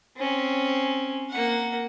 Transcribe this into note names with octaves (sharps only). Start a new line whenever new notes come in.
C4 C#4
A#3 F#5